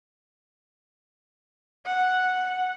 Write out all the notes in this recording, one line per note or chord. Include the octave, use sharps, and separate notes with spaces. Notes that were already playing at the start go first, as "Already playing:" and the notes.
F#5